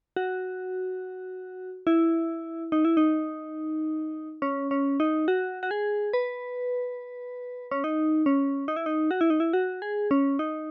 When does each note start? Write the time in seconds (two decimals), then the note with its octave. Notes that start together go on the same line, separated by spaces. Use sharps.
0.16 F#4
1.87 E4
2.72 D#4
2.85 E4
2.97 D#4
4.42 C#4
4.71 C#4
5.00 D#4
5.28 F#4
5.63 F#4
5.71 G#4
6.13 B4
7.71 C#4
7.84 D#4
8.26 C#4
8.68 D#4
8.76 E4
8.86 D#4
9.11 F#4
9.21 E4
9.30 D#4
9.40 E4
9.53 F#4
9.82 G#4
10.11 C#4
10.39 D#4